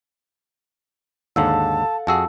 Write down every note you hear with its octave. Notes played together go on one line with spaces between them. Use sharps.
D#2 G#2 D3 A4 F5 F#5 A5 E6
F2 F#4 G#4 F#5 A5 E6